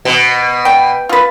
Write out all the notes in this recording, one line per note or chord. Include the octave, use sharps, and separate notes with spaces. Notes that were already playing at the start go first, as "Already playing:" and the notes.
B2
G5
F4 B4